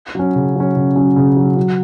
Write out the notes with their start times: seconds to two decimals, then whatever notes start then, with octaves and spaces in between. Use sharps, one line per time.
0.15 F#3 C#4
0.35 C#3
0.56 F#3 C#4
0.76 C#3
0.96 F#3 C#4
1.16 C#3
1.37 F#3 C#4
1.57 F#3